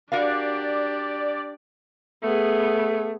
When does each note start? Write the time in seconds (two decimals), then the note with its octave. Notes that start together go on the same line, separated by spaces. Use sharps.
0.12 D4 F#4 G4 A#4 D5 F5
2.23 A3 B3 G#4